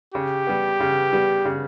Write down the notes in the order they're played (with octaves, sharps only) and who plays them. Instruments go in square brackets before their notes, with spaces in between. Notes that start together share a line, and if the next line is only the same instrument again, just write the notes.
[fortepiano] C#3 [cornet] G4
[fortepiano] G3 B3
C#3
G3 B3
C#3